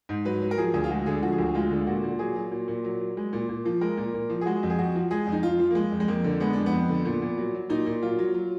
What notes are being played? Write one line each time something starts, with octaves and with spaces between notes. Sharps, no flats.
G#2
F#3 B4
F#3
A#4
F3 G#4
D2 G#4
F4
G#3 F#4
D3 G#4
F3 F#4
G#4
D2 F#4
G#3 F4
D3
A#2 F#4
A#2
F#3 G#4
F#3
A#2
A#2
F#3
F#3
G#3
A#2
A#2
F3
G#3 A#4
A#2
A#2
F3
G#4
G#3 F#4
F2
G#4
F2 F#4
F3
G#3 G#4
F2
D#4
F2 F4
F3
A#3
G#3
F2
G#3
F2 A#3
D3
G#3 B3
F2 D4
B3
F2
D3
A#2
A#2
F#3
F#3
A#2 D#4
A#2
F#3 F4
F#3
F#3